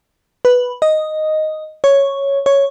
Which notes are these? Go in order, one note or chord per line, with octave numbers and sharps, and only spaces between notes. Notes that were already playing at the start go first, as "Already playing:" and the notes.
B4
D#5
C#5
C#5